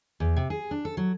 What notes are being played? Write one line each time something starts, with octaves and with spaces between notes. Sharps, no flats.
E2
C3
G#4
D4
A4
F#3